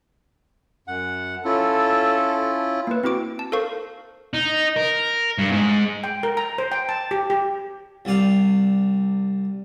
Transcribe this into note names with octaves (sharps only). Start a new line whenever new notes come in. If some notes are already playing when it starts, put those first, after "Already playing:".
F#2 F#5
C#4 E4 F4 A4
A#3 B4
C4 E4 F#4 D6 D7
A5
A4 A#4 C5 F5 C#6
D#4
A#4
G2
G#2
G5
A#4
A#5
C5
G5
A5
G4
G4
C2 C3 D5 F5